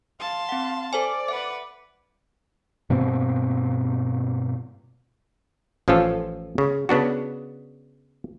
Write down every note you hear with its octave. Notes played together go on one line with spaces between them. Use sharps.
F5 A5 C6
C4 F#5
A4 C5 D5 G#5
B4 E5 F#5
G2 B2 A#3 C4
A1 F3 C#4 F4 A4
C#3
C#3 B3 D4 F#4